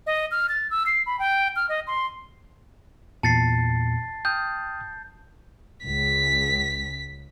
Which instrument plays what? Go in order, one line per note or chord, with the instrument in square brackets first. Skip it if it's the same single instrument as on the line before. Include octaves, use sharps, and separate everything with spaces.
[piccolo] D#5
F6
A6
E6
C7
B5
G5
F6
D#5
C6
[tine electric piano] E2 A#2 C#7 [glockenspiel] A5 A6 C7
[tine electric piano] G5 D#6 F6 [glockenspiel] G6
[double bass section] C#2 [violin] B6